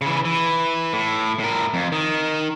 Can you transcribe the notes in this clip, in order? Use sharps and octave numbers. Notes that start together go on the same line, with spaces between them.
C#3 E3
E3
A2
A2 A#4
F2
D#3